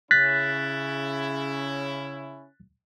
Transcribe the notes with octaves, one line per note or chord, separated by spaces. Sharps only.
C#3 C#4 E4 F#6 A6 B6